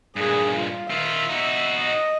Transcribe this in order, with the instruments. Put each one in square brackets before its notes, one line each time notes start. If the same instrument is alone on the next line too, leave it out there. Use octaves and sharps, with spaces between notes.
[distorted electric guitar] G2 A#2 [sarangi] G#4
[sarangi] F4
[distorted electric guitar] D#3 F4 [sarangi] E5
[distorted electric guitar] D#4 F#4
[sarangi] D#5